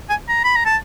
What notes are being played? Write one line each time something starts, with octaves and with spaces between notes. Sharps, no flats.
G#5
A#5
B5
A#5
A5